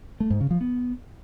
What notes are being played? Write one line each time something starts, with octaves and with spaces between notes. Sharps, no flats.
A3
G#2
C#3
F3
B3